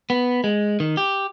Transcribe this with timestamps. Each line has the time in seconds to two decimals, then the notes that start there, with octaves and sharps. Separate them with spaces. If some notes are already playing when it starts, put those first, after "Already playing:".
0.10 B3
0.44 G#3
0.80 D#3
0.97 G4